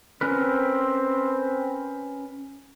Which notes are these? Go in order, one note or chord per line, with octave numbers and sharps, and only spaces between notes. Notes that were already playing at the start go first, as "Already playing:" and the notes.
C4 C#4 A#4 B4